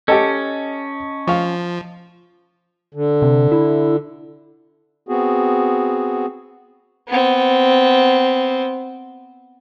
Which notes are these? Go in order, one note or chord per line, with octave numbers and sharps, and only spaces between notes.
C#4 G4 A4 D#5 A5
F3 F5 C#6
D3
C3
E4
B3 C4 F#4 G#4
B3 C4